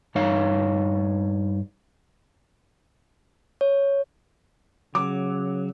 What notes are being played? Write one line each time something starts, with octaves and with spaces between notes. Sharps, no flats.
G2 D#4 C#5 F5
C#5
C#3 F#3 D6